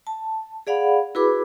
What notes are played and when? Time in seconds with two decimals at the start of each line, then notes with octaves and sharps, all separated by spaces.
0.07 A5
0.67 G#4 D5 F5 F#5 B5
1.15 E4 F#4 G#4 B4 B5 D6